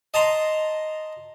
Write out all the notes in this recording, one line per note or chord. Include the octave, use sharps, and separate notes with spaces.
D#5 A5 A#5 C6